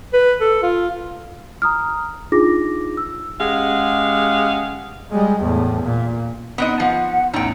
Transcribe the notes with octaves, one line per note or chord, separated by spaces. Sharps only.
B4
A4
F4
A#5 D#6 F6
D4 D#4 F4 G#4 D6 A#6
E6
G#3 C#4 G4 G#4 F5 F#5
G3 G#3
E2 A2
A#2
B3 C4 D#4 D#5 F#5 D#6
F3 B3 F#5
A1 E2 D#4 G5